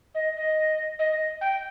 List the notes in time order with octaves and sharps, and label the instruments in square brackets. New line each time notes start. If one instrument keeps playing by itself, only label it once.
[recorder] D#5
D#5
D#5
G5